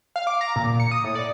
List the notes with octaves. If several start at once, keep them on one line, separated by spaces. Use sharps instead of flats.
F5
D6
A#5
A#2
C#7
D#6
A2
D5